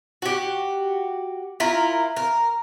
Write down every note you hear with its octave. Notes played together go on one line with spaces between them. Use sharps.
F#4 G4
E4 F4 A#4
A#4